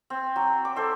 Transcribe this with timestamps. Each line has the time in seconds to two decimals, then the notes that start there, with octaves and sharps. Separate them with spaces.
0.10 C4
0.36 F#3
0.65 D6
0.76 A4 C5 E5